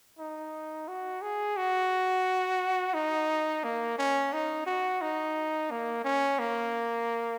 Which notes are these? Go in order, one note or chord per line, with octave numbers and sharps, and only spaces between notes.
D#4
F#4
G#4
F#4
D#4
A#3
C#4
D#4
F#4
D#4
A#3
C#4
A#3